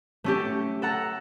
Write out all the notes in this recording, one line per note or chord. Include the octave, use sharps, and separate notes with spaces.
A3 C#4 G4
A4 F#5 A#5